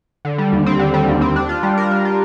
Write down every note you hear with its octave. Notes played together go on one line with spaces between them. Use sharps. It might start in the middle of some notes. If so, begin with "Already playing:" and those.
D3
G3
D#2
C4
D3
G3
D#2
C4
D4
F4
G3
A#4
D4
F4